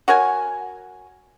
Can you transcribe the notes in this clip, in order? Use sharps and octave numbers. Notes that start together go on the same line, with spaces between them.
F#4 A#4 C#5 G#5